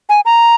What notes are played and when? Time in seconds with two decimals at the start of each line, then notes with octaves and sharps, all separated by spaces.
0.09 G#5
0.25 A#5